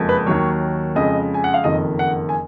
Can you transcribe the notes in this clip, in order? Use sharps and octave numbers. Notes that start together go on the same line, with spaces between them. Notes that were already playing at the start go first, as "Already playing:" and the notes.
Already playing: F#1 F2 F3 G#3
B4
D#2 D#3 F#3 C#5
F2 C#3 G#3 D#5
G#5
F#5
F5
F#1 F2 D#3 D#5
F#5
G#5